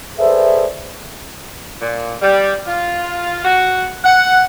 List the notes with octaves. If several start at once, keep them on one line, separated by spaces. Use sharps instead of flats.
G#4 A4 B4 C5 D5 E5
A#2
G3
F4
F#4
F#5